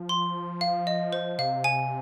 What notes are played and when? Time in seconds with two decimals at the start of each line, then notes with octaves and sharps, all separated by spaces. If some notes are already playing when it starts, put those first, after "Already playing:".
Already playing: F3
0.09 C6
0.61 F5
0.87 D#5
1.13 C5
1.39 C3 F5
1.64 G#5